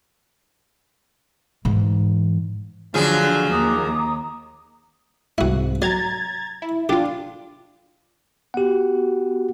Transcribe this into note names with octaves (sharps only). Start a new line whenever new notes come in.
G#2 E3
D3 F3 F#3 G#4
D#2 A#5 D6 D#6
C2 G#2 E4 F#4
F#3 A#5 G#6 A6
E4
D4 F4 G4
B3 F#4 G4 F#5